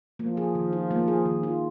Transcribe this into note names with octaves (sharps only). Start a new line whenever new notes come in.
F3 A#3
G#4
D#3
F4
A#3
G#4
D#3
F4